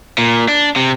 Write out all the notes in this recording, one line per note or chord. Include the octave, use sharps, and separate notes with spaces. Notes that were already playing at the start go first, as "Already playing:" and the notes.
A#2
D4
C3